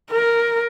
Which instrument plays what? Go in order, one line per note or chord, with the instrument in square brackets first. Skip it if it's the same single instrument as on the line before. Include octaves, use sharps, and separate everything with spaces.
[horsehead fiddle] A#4